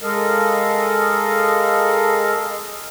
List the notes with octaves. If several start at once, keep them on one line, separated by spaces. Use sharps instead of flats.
G#3 A4 A#4 D#5 F5